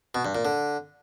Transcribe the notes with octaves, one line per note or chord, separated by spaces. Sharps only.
B2
G2
A#2
D3